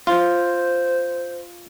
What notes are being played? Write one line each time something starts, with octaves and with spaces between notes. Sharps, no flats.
F4 C5